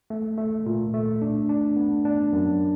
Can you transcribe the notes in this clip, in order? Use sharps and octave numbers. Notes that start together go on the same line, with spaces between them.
A3
A3
A#2
A3
D4
D4
B3
D4
F#2